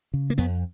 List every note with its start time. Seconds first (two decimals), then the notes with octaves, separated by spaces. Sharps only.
0.14 C#3
0.30 A#3
0.38 F2 B3